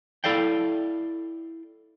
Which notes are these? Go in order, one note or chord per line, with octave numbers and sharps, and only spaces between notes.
E4 A4 D5 F5 G5